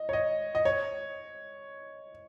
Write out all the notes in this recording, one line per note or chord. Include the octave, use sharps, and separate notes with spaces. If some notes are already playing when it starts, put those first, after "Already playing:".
Already playing: D#5
C#5
D#5
D#5
C#5